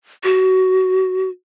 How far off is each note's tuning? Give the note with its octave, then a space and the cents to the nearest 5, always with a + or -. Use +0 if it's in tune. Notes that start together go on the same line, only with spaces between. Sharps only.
F#4 +20